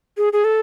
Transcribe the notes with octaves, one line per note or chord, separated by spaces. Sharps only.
G#4
G#4
A4